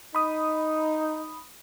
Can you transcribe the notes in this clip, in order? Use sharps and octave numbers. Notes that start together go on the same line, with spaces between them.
D#4 B5 D#6